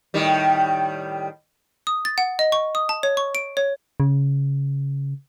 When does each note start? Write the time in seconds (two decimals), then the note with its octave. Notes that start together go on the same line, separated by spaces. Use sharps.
0.14 A2 D#3 G3
1.87 D#6
2.05 A6
2.18 F#5
2.39 D#5
2.52 C#6
2.75 D#6
2.89 A5
3.03 C#5
3.17 C#6
3.35 D7
3.57 C#5
4.00 C#3